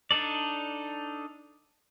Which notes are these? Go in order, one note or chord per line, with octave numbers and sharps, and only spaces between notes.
D4 D#4 A4 D5